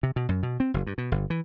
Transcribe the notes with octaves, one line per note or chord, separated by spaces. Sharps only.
C3
B2
F#2
B2
C4
F#1
G2
B2
G1
E3